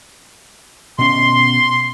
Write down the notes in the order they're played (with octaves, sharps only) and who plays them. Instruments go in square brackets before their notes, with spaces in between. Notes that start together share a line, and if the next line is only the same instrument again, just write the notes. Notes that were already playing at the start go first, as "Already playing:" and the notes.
[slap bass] B2 C#4 [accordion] C6